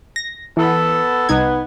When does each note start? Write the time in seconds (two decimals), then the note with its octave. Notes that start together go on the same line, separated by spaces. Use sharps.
0.16 A#6
0.57 E3 B3 A4
1.29 C2 B3 D#4 G#6